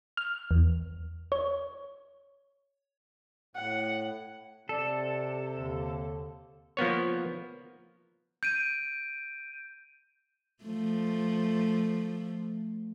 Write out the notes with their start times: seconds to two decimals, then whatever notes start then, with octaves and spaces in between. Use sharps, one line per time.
0.17 F6
0.51 E2
1.32 C#5
3.56 A2 F#5
4.69 C3 A4 D5
5.55 D#2 D3
6.77 F3 A#3 B3 C#5
8.43 G6 D7 D#7
10.64 F3 A3